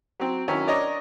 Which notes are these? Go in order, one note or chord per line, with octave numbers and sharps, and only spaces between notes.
F#3 C4
D#3 F#3 C#4 E4
D4 A#4 C#5 D#5